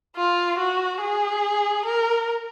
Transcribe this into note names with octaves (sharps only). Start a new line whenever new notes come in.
F4
F#4
G#4
A#4